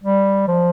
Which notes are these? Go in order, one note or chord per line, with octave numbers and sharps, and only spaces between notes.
G3
F3